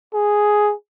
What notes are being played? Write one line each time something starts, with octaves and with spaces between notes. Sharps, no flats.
G#4